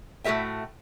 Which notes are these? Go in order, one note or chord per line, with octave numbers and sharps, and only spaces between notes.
A2 A3 F#4 A#4 E5 G5